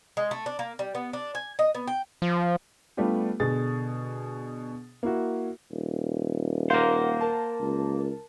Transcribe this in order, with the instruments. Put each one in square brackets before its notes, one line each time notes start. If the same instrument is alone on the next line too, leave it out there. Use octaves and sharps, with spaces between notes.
[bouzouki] G#3
A3
D4
A#3
G3
B3
D4
G#5
D#5
B3
G5
[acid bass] F3
[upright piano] G3 A3 B3 D4 F4 G4
B2 D3 G#4 A6
A#3 E4 F#4
[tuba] D#1
[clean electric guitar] A#3 C5 [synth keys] A#4 F5 F#5
[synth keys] A#4 A5
[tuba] C#2